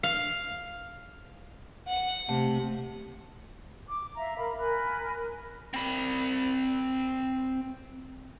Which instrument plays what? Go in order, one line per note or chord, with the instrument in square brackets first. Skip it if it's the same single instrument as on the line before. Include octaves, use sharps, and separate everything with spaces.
[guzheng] F5
[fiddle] F#5
[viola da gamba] C3 [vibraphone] A3
[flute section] D6
E5 F5 A#5
A#4 F5 B5
A#4 G#5 B5 F#6
[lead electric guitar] C4 B5